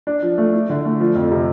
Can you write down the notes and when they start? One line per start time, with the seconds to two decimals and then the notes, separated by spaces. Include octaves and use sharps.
0.07 D4
0.22 F3
0.38 A3
0.53 E4
0.70 D3
0.85 A3
1.00 F3
1.15 F2
1.31 C3